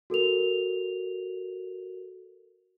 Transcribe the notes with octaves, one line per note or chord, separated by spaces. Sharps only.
F#4 A4 A#4 F7